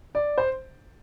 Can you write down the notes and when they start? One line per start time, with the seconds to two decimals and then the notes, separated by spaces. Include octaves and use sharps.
0.15 D5
0.38 C5